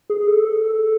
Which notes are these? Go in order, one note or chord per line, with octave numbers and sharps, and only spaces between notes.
G#4
A4
A4
A4